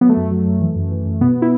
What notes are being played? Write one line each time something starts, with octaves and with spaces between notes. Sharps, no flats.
F#3 B3
A3
F#2
A3
F#3
F#2
E3
F#2
E3
F#2
B2 B3
E4